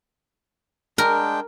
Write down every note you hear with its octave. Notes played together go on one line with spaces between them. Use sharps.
G#3 D4 A#4 G5